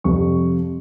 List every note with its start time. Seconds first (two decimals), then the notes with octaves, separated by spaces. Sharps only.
0.04 F2 C3 G3 C#6